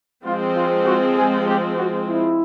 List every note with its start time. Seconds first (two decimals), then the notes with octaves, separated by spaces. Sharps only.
0.24 F3 G#3 C4 F4
0.56 F4
0.85 F#4
1.16 G#4
1.46 G4
1.76 F#4
2.06 E4